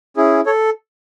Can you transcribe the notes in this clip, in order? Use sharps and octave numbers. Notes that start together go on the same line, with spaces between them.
C#4 E4 G#4
A4 C#5